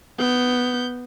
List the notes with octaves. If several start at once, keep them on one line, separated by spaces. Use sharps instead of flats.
B3 G6